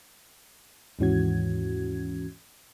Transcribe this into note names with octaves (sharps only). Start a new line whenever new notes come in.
D#2 G#2 E3 C#4 F#4 G#6